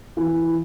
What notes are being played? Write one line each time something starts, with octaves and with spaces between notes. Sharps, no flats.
E3